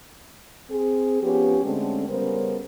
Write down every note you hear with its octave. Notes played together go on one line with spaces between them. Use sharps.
C4 G#4
F3 B3 C#4 G4
D3 G#3 A3 C4 C#4
C#3 G3 B3 C#4 A#4 C5